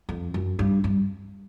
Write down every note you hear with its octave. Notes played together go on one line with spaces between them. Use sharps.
F2
F#2
G2
G2